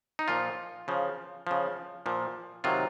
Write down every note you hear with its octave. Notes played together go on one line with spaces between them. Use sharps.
D#4
A#2 F3 F4
C#3 F3
C#3 F3
A#2 F3
C3 D#3 F#3 F4